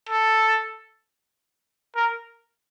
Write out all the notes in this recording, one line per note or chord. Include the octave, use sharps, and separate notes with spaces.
A4
A#4